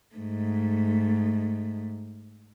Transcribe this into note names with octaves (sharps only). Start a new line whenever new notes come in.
G#2 A3